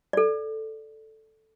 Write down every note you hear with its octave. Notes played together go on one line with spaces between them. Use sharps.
A4 D5